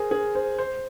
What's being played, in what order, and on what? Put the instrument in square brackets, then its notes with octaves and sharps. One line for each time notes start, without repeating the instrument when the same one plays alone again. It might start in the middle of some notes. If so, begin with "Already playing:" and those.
Already playing: [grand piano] G#4 A#4 C5
G#4
C5
C5